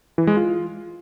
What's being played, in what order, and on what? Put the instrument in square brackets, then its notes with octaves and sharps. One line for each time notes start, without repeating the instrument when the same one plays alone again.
[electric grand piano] E3
G#3
F4